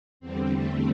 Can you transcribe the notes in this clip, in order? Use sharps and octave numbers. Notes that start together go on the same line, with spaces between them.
E2 D3 G3 C4
A3